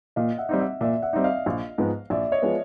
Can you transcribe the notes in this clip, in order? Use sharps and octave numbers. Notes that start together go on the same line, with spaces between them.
A#2 D#5 F5
E5 F#5
G3 C4 D#4
E5 F#5
A#2 D5 E5
E5 F#5
G3 C4 D#4
D#5 F5
A#1
G#2 F3 G#3 B3
A#1 D5 E5
C#5 D#5
F3 G#3 B3